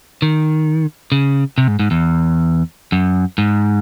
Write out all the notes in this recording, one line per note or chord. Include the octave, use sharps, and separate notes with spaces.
D#3
C#3
C3
G#2
G#2
E2
F#2
G#2